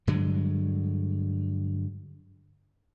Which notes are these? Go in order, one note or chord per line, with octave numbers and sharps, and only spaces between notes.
G2 D3 F#3 G#3